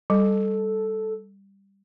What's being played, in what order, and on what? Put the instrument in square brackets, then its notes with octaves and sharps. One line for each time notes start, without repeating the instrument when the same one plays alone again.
[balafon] G3 [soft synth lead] A4